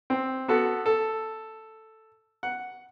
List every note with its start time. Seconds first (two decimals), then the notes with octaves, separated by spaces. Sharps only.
0.10 C4
0.48 B3 F#4 A4 F#5
0.86 A4
2.43 F#5